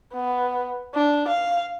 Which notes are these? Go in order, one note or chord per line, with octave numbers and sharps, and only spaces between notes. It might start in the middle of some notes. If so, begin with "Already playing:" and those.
B3
D4
F5